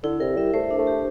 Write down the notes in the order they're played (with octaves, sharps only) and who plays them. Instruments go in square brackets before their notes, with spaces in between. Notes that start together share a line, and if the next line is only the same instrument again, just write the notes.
[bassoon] D3 [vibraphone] E4
[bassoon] C3 [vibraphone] A#4
[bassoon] G3 [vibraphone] E5
[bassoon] A3 [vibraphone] C5
[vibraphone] D4
[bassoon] A3
[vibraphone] G4